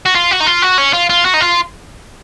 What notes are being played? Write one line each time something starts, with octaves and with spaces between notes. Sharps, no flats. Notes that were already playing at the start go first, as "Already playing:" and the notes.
F#4
F4
F#4
D#4
F4
F#4
C#4
F4
F4
F#4
D#4
F4